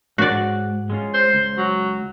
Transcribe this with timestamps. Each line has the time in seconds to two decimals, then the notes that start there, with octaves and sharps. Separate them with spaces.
0.18 G#2 F#4 D5
0.90 G#3 C#4 F4
1.14 C5
1.33 C#2
1.58 F#3